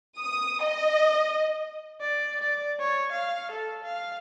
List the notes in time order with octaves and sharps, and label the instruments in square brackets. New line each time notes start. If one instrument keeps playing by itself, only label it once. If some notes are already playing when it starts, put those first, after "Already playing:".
[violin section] D#6
D#5
[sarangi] D5
D5
C#5
F5
A4
F5